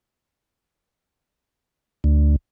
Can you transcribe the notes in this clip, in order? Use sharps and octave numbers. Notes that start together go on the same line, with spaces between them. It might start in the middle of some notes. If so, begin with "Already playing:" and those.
D2